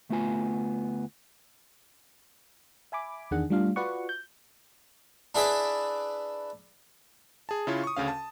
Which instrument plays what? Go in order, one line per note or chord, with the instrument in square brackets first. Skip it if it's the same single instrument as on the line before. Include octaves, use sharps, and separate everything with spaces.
[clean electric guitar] D2 A3 B3 F4 G#5
[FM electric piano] E5 G#5 B5 D6
E2 D#3 D4 G#4 F#5
G3 A3 D4 F4 F5
F4 F#4 B4 D5 F#5 C#6
G6
[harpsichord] D4 E4 G#4 B4 D5
[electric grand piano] G#4 A5
C#3 E4 F4 C#5
C#6 D#6
D2 C#3 C#4 F5
A5